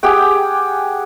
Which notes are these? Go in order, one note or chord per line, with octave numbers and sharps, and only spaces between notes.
G4 G#4 F#5 G5